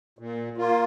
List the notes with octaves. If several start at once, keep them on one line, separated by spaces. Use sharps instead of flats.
A#2
A#3 F4